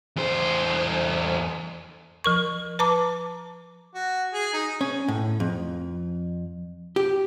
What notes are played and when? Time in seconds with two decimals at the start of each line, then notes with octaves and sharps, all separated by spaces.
0.16 E2 C5
2.24 F3 A#4 C#6
2.79 B4 A5 A#5 D6
3.95 F#4
4.34 G#4
4.53 D#4
4.81 C#4
5.08 A2
5.40 F2
6.96 G4